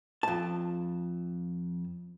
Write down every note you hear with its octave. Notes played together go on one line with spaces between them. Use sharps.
F2 A5